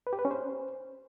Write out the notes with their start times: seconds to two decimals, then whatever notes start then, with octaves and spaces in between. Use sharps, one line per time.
0.07 B4
0.13 G4
0.19 B4
0.25 C#4
0.31 C5